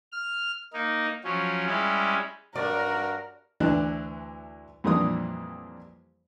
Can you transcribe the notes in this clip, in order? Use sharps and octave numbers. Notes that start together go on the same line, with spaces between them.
F6
A#3 D#4
F3 F#3 C#4
G3 G#3 C#4 E4
G2 F#4 A#4 D5
D2 E3 D4 F#6
F2 A#2 E3 G3 D4 D#6